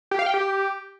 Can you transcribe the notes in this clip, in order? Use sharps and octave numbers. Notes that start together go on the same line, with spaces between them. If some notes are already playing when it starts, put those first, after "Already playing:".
G4
F5
G5
G4